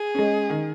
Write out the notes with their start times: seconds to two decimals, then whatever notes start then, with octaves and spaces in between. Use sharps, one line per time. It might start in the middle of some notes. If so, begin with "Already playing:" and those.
Already playing: G#4
0.15 G#3 C#4
0.50 D#3